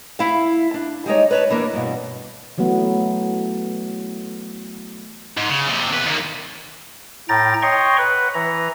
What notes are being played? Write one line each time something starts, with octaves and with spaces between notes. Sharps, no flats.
E4 E5 F5
D4
G3 G#3 D#4 C#5
B4 C#5 A5
E2 E3 A#3 D4
G2 B2
E3 F#3 A3 B3
G#2
C#3
D#2 C3
E2 B4
D#2 A#3
A2 G5 A#5 A6
C#5 D#5 G5 A#5 C6 C#6
B4 F#5
E3 A#5